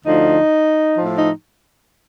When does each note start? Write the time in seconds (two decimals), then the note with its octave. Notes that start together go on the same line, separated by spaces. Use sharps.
0.05 D2 D3 F3 D#4
0.97 A2 F3
1.16 D#4